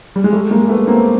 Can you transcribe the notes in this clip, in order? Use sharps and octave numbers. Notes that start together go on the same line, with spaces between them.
G3
G#3
G3 A3
G#3 A#3
A3 B3
A#3 C4